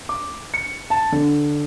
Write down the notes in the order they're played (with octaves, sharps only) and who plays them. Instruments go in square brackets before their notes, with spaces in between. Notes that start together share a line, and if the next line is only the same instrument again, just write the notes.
[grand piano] D6
C#7
A5
D3